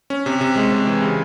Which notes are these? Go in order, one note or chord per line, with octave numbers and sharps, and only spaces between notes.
C#4
C3
C3
G#3
C3
E3
C#3